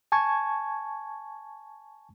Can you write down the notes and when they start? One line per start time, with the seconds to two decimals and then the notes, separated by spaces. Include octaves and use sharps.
0.12 G#5 A5 C#6 G#6